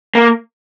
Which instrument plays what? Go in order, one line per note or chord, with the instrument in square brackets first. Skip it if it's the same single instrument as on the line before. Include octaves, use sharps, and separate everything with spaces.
[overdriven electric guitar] A#3